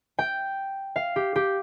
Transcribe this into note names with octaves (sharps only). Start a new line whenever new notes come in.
G5
F5
G4
G4